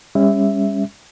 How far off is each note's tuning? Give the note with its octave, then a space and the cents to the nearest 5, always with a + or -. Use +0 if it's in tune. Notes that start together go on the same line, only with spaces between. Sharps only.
G3 +40 C#4 +0 E5 +0